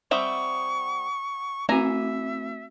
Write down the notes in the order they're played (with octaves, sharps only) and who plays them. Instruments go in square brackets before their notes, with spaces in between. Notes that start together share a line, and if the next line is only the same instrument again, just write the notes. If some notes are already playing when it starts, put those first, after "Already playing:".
[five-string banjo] G3 C4 E5 [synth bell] F#5 D#6 [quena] C#6
[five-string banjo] E3 G#5 A#5 [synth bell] A3 C4 F#4 [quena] E5